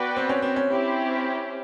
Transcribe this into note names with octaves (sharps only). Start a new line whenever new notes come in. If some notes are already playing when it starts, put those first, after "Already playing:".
Already playing: B3 F#4 B4 D5 G5
C4
C#4
C4
C#4
C4 E4 G4